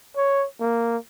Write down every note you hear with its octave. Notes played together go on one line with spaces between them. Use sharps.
C#5
A#3